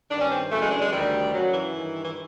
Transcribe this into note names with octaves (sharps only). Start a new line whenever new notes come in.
G2 D#3 D4
C#4
C4
F#2 C#3 E3 A3
G#3
D4
G#3
D2 C3 D#3 G3
F#2 C#3 E3 F#3
E3
G2 D#3
E3